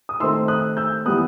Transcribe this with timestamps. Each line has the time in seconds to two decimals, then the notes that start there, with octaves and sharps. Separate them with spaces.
0.09 D#6
0.20 D#3 A3 C4 C6 E6
0.48 D#6 F#6
0.77 E6 G6
1.05 E3 G3 B3 D#6 F#6